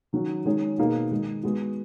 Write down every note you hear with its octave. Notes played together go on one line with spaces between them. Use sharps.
D#3 F#3 C#4 F#4
D#3 G#3 C#4 G#4
B2 A#3 D#4 G#4
D#3 G#3 D#4
G#3 B3 F#4